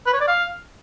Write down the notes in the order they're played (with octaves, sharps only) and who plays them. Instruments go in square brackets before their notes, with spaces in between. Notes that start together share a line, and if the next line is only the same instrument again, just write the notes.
[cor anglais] B4
C#5
D5
F5